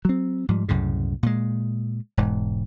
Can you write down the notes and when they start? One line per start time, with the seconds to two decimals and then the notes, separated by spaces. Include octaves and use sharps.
0.05 F#3 C4
0.48 G#2 F3 G3
0.69 C2 F#2 A2 C#3
1.23 A#2 G#3
2.17 E1 G#2